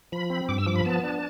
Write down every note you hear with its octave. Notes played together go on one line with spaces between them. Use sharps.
F3 B5
C4
G2 D6
E6
F3 D6
B5
B3 A5
D4